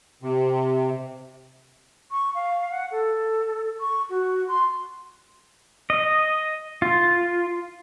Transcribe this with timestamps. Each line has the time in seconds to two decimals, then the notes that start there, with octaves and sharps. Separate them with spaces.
0.22 C3
2.11 C#6
2.35 F5
2.71 F#5
2.91 A4
3.80 C#6
4.10 F#4
4.48 C6
5.90 D#5
6.82 F4